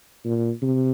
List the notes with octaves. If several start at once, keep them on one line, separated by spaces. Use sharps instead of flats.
A#2
C3